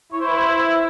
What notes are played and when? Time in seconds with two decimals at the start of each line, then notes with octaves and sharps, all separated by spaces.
0.12 E4 C#5
0.21 C5
0.28 B4
0.36 C5